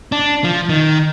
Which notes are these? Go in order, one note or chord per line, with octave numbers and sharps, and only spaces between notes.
D4
F3
D#3